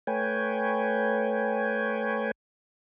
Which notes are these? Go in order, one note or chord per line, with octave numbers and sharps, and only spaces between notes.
A3 B4 C#5 G5 G#5